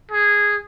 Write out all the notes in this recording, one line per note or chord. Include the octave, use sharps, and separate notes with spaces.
G#4